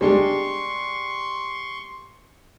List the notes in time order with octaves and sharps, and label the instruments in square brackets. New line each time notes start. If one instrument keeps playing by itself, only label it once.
[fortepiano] G3 G#3 D4 [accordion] C6 C#6